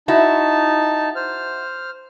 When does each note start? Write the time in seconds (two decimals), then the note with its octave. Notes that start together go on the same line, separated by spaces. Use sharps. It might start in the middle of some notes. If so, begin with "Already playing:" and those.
0.08 D#4 E4 F#4 A5
1.16 C5 F6